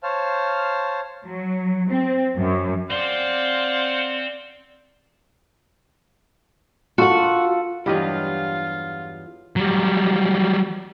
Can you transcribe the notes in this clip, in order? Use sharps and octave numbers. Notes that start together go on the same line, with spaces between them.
C5 C#5 F5 A5 F6
F#3
C4
F#2
C4 C5 D5 F5 F#5 C6
F4 F#4 A4 F#5
E2 G2 F#3 F4 G4 D#5 F5
F#3 G3